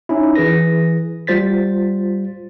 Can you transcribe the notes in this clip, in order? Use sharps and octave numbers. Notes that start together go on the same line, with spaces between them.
C#4 D#4 E4
E3 G#4 B4 A#6
G3 F4 C5 A6 B6